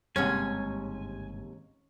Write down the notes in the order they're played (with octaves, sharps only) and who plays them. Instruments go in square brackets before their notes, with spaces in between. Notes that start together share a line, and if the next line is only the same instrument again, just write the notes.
[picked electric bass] G1 G3 G#3 [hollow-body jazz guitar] D#2 G#2 C3 [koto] C#4 [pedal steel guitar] G#5